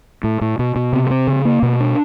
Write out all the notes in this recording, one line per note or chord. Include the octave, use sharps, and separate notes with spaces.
A2
A2
B2
B2
C3
C4
C#3
A#3
B2
D4